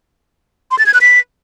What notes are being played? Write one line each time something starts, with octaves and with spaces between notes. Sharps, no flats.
C6
A6
G#6
F#6
B6